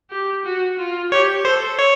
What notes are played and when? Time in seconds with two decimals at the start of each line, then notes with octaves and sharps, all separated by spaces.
0.10 G4
0.44 F#4
0.78 F4
1.11 G4 C#5
1.45 A4 C5
1.79 C#5